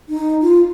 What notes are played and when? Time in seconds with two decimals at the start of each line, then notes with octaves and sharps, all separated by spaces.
0.09 D#4
0.42 F4